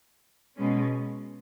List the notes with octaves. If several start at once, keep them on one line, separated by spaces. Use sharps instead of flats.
B2 G#3 C#4